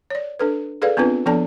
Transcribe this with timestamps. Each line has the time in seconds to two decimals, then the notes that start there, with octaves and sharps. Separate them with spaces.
0.10 C#5 D5
0.39 D4 A4 B4
0.82 G#4 A4 B4 D5 F5
0.97 B3 C4 D4 F4 B4
1.26 F3 B3 D4 A4 D5 A5